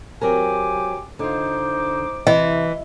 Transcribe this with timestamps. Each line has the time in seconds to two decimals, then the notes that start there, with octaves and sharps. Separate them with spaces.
0.21 F#3 C4 G4 A#4 G#5 D6
1.19 D3 D#4 F4 C5 D6
2.27 C3 E3 D#5